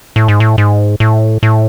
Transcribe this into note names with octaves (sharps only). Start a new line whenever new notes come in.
A2
G#2
A2
G#2
A2
A2